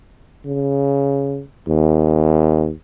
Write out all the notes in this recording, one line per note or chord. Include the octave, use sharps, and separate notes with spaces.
C#3
D#2